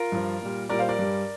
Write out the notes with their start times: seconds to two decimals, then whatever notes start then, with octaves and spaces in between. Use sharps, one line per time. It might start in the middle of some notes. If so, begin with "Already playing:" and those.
Already playing: F4 A#4
0.12 G2 F3
0.41 A#2 G3
0.69 A#2 G3 A#4 D5
0.79 C5 F5
0.89 A#4 D5
0.98 G2 G3